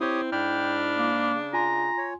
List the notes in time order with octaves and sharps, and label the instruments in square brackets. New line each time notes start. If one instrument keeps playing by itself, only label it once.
[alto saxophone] C4 [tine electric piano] E4 G6 [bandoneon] G4 C#5 D#6
[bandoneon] G#2 B5 F6 [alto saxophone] D4 [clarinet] G5
[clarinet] A#3
[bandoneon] C#3
[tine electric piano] F4 G#5 C6 [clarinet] A#5
[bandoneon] C#5